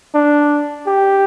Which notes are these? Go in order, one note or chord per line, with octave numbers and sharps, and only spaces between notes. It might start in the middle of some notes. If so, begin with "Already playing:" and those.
D4
G4